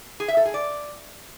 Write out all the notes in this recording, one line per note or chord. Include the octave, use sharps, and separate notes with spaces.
G#4
E5
A4
G#4
D5